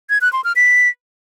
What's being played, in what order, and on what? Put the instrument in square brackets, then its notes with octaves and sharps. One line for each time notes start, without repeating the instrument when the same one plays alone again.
[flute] G#6
F#6
C6
F6
B6